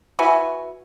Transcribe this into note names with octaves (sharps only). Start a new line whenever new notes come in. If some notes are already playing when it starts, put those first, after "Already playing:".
E4 F#4 B4 G#5